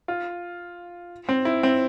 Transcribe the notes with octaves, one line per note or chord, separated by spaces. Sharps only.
F4
C4
E4
C4